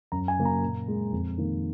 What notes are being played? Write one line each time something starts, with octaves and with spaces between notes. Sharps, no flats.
F#2 A#5
G#5
C#3 F#3 A#3
A#5
A#2
G#3
F2
D#3 A#3